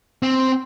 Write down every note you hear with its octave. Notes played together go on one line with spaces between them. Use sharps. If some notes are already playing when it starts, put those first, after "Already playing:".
C4